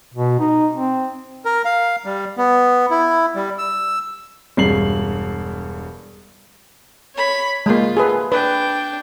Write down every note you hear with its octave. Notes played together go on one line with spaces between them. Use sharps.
B2
D#4
C4
A#4
F5
G3
B3
E4
G3
E6
E1 G2 C7 F#7
C#5 B5
G#3 A#3 F4
G#4 A4 B4
D4 B4 G5